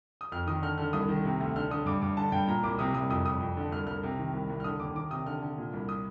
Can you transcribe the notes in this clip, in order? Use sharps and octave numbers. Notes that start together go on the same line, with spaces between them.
D#6
F2 F6
D#3 D#6
D3 F6
D3 F6
C2 D#6
D#3
C3
D2
D3 F6
D3 D#6
G2 D6
G2 D6
D3 A5
G2 G5
A#2 A#5
C2 D6
C3 D#6
C2 D#6
F2 D#6
F2 D#6
F2
D3
C2 F6
C2 F6
C3
D#3
C2
C2
F6
D3 D#6
D#2 D6
D#3 D6
C3 D#6
D3 F6
D3
A#2
C2
D#6